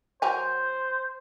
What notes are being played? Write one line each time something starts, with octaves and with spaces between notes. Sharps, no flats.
F#3 A#4 C5 G#5